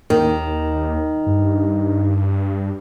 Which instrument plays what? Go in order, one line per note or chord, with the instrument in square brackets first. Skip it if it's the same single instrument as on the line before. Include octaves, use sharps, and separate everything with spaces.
[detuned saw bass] D#2 [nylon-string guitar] D#3
[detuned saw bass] G2